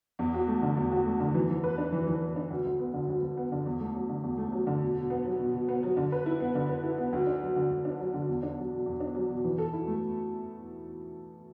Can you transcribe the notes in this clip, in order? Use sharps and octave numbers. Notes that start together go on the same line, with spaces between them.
E2
F#4
A3
D3
E2
F#4
A3
D3
E3
E3
B4
D4
E3
E3
B4
D4
D2
D2
B3
D3
D2
D2
B3
D3
E2
A3
F#3
D3
E2
A3
F#3
D3
B2
B2
B3
F#3
B2
B2
B3
F#3
D3
B4
E4
B3
D3
B4
E4
B3
D2
D4
F#3
D3
D2
D4
F#3
D3
E2
D4
F#3
B2
E2
D4
F#3
B2
E3
A4
E4
A3